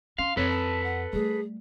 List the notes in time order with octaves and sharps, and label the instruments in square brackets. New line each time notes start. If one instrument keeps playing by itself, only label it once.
[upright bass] C#4 [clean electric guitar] F5 [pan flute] C6
[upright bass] F2 [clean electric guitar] A4 B4 [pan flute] C#5
[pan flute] A5
F#5
[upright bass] G3 A3 [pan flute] G#4